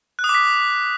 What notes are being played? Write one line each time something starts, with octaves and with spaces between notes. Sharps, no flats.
F#6
D#6
D6
B6